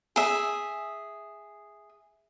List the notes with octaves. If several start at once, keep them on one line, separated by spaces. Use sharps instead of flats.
G#4 E5